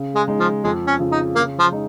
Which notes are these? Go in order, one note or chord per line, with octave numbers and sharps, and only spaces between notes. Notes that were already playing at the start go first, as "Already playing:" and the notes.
Already playing: C#3
G#3
G#3 D#4
F3
F2 G#3
C#4
C#3 F3
D#4
C#3 A#3
F3
G#3 D#4